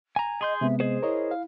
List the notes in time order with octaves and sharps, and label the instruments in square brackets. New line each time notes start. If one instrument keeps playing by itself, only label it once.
[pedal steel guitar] G#5 A#5
[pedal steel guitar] G#4 C6 G6 [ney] D#5
[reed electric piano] C3 G#3 B3 [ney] E5
[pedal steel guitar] G#4 C5 [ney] D#5
[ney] E4 [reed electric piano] A#4 C#5 D#5
[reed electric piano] F5